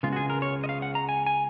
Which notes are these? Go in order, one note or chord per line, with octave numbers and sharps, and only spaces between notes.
C#2 C#3 G#3 B3 F4
F#4
G#4
A#4
C#5
D#5
F5
F#5
A#5
G#5
G#5